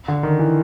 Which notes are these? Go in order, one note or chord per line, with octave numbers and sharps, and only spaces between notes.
D3
D#3
E3